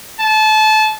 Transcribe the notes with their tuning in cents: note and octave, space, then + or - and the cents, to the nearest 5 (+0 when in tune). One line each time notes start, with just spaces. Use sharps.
A5 -25